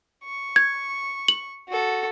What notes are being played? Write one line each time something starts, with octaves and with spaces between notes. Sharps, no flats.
C#6
G#6
F#7
F#4 A4